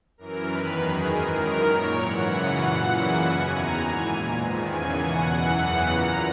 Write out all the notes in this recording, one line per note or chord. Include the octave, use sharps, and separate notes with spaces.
F#2 E3 A#4
E2 D#3 B4
F#2 D#3 G#4
G#2 E3 A#4
F#2 D#3
A#2 C#5
G#2 E3 F#5
F#2 C#3 E3
A#2
F#2 C#3 E3
E2 B2 G#5
E2 D#3 A#5
G#2 E3 G#5
A#2
G#2 D#3
E2 C#3 E3 G#5
E2 B2 F#5
F#2 E3
E2 C#3 E3
A#2 A#5